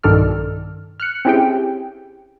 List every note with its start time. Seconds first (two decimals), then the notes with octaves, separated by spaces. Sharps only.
0.03 B1 G2 D#3 A4 D5 F6
1.00 F6 F#6 C#7
1.25 C4 C#4 E4 G4 G#4 G5